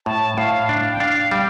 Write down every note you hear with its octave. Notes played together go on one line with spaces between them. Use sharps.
A2 A5
A2 F5
D4 F5
G5
D4 F5
G3 G5